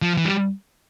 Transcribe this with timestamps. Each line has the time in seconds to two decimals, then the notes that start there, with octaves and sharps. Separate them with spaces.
0.02 F3
0.17 E3
0.25 G3